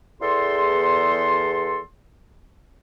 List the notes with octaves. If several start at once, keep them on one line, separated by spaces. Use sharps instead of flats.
E2 A4 C6